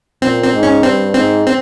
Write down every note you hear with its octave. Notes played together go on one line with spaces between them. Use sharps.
A#2 C4
C4
G#2
C#4
G2 C4
G#2 C4
C4